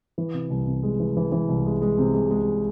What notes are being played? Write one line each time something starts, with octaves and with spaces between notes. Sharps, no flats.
E3
C3
C2
C3
G#3
E3
E3
E3
C2
G#3
G#3
C3
G#3
G#3